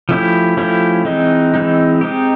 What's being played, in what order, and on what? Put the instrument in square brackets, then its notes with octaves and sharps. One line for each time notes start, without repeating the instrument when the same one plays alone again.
[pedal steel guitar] F3 A3 C#4 E4 G4
F3 A3 C#4 E4 G4
E3 G#3 C4 D#4
E3 G#3 C4 D#4
G#3 C4 D#4 G4